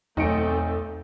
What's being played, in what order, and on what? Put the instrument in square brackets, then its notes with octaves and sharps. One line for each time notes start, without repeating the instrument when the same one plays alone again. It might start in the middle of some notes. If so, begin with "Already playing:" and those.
[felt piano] B1 C#7 D7 [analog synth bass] E2 [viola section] A3 C4 A4 [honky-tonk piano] D#4